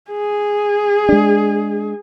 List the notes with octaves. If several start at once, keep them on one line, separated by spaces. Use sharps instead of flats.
G#4
G#3 D4